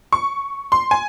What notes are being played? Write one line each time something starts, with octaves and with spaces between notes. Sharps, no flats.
C#6
C6
G#5